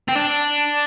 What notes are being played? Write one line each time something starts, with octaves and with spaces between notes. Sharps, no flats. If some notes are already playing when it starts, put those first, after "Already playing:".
C4
D4